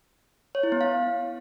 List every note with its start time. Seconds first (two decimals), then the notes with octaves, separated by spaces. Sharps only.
0.55 C#5
0.63 E4
0.72 B3
0.81 F5